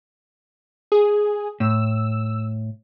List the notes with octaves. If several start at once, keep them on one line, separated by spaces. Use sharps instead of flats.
G#4
A2 E6